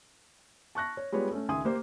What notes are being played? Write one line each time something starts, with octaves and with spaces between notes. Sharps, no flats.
A5 C#6 F#6 A#6
C#5
G3 G#3 B3 F4 B4 C#5
A3 C#4
C#2 D#3 E5 G#5 C6 D#6
A#3 G4 C5